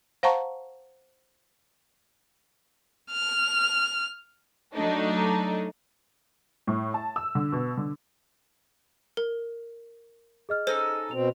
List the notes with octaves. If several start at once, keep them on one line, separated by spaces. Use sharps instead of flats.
C5 F5 F#5 A5 A#5 C#6
F6
F#3 A3 D4 D#4
A2
A5
E6
D3
B2
D3
A#4
G#4 D#5 F6
C#4 D#4 A4 C5
B2 C4 F7